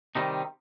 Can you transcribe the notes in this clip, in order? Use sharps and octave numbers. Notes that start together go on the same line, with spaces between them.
C3 D#3 G3 D#4